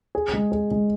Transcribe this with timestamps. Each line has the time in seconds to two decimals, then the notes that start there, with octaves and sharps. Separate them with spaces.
0.15 G#4
0.33 G#3
0.52 G#4
0.71 G#3